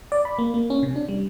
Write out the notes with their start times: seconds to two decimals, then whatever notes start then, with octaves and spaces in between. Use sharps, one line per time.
0.12 D5
0.25 B5
0.38 A#3
0.54 A#3
0.70 C#4
0.83 C3
0.96 D4
1.09 G3